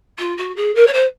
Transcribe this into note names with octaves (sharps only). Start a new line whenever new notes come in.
F4
F#4
G#4
A#4
C#5
C5